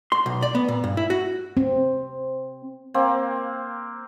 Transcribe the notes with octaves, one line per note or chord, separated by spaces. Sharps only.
C6
B1
D5
B3
A#2
G2
E4
F#4
C4
A#3 C4